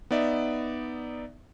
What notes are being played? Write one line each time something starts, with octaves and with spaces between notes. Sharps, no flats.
B3 D#4 D5 E5